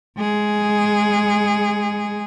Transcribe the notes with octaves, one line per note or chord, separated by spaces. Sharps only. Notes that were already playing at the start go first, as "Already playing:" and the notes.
G#3 G#4